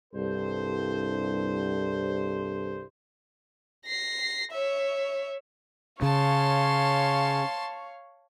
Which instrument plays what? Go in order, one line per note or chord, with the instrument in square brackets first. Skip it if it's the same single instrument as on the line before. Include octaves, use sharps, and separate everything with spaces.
[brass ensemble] C2 G2 A4 C5
[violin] A#6 C7
C#5 E5
[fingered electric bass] C#3 [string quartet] C#5 F5 C#6 [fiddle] A5 C6